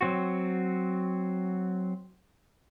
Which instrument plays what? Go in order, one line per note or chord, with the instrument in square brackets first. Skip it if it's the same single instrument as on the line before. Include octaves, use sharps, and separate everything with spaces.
[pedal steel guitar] F#3 C4 F#4